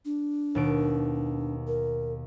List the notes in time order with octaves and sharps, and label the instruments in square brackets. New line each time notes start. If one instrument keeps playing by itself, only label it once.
[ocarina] D4
[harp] D#2 B2 D7
[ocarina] A#4